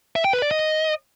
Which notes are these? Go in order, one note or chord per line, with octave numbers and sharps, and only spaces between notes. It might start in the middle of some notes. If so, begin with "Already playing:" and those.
E5
G5
B4
D5
D#5